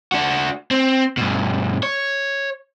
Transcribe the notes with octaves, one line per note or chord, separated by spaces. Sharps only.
D4 F#4
C4
G2 B2
C#5